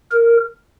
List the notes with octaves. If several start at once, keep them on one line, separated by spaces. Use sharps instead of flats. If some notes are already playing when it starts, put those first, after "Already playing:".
A#4